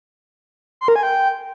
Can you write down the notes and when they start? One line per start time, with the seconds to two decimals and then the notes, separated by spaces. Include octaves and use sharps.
0.81 C6
0.88 A#4
0.96 G#5
1.03 G5